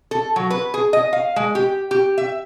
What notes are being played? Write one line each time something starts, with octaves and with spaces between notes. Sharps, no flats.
A4
F#3
B4
G#4
D#5
F5
G#3
G4
G4
E5